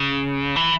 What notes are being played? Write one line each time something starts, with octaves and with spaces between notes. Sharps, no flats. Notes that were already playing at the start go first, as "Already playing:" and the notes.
Already playing: C#3
E3